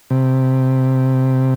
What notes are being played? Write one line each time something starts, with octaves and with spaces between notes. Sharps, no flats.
C3